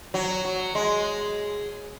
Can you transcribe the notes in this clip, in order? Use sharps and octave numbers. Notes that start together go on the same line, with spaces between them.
F#3
F#3
G#3